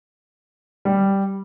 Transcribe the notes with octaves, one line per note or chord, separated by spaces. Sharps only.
G3